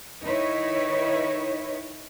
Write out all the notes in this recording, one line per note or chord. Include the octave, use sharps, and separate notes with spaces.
D#3 D#4 E4 B4 C#5